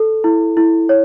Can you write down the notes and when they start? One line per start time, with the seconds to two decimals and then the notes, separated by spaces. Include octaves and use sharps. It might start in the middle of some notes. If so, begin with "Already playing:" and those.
Already playing: A4
0.24 E4
0.57 E4
0.89 C#5